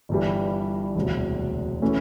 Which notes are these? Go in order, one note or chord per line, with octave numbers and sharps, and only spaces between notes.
G1 G2 E3 G3
E1 D2 C3
E3 A3 C#4